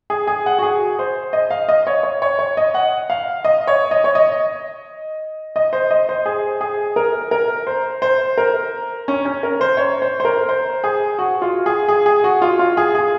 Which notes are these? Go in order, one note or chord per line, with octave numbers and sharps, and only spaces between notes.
G#4
G#4
F#5
F#4
G#4
C5
D#5
F5
D#5
C#5
C#5
C#5
C#5
D#5
F#5
F5
D#5
C#5
D#5
C#5
D#5
D#5
C5
D#5
C5
G#4
G#4
A#4
A#4
C5
C5
A#4
C#4
C#4
A#4
C5
C#5
C5
C5
A#4
C5
G#4
F#4
F4
G#4
G#4
G#4
F#4
F4
F4
G#4
G#4